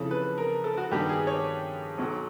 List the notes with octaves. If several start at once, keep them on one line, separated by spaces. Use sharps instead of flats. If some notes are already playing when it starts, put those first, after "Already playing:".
Already playing: F2 C#3 E3 A4
B4
A#4
A4
F#4
G2 D#3 G3 B3 G4
G#4
C#5
B1 B2 F#3